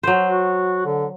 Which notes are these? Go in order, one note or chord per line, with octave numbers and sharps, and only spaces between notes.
F#3 C5
F#4
D3